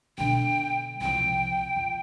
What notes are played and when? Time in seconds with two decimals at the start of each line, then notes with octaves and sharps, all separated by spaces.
0.18 B2 D3 G5
1.01 C2 F3 G5
1.76 F2